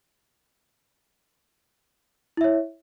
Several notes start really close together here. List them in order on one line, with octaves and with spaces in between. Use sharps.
E4 E5 C#5